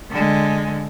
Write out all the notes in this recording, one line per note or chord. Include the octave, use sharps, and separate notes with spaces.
D3 G#3